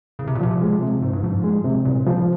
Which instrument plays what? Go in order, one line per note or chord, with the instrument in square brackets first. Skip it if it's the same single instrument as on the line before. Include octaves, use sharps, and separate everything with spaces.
[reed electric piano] C2 [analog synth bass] C#3
[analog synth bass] C3
A#2
[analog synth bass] C3 [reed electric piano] F3
[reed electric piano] G#3
C3
[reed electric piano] C2 [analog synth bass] G#2
[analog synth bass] G2
[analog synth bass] G#2 [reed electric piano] F3
[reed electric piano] G#3
C3
[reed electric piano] C2 [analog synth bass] A#2
[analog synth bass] C#3 [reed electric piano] F3